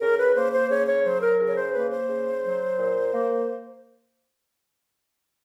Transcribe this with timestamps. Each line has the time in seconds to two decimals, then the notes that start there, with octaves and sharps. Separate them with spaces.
0.01 C#3 A#4
0.18 B4
0.35 A#3 C5
0.53 C5
0.70 C#3 C#5
0.88 C#5
1.05 F#3 C5
1.22 A#4
1.39 C#3 A#4
1.48 C#5
1.56 C5
1.74 A#3 B4
1.91 C5
2.09 C#3
2.43 F#3
2.78 A#2
3.12 A#3